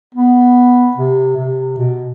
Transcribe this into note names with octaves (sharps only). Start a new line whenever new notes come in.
B3
C3
C3
B2